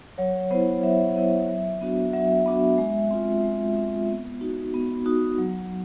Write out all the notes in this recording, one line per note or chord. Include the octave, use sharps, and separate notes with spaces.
F#3 C#5
B3 E4 C5
F#3 E5
B3 E4
F#3
B3 D4 F#4
F#3 E5
B3 D4 F#4
G#3
C4 F4
G#3
C4 F4
B3
D#4 F#4
B3
D#4 F#4
F#3